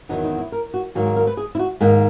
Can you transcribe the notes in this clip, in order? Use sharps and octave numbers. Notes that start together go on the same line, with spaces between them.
E2 D#3 F#3 B3 D#4
D#4
E4
A#4
F#4
G#2 D#3 F#3 A#3
G#4
A#4
B4
G#4
E4
F#4
G#2 D#3 A#3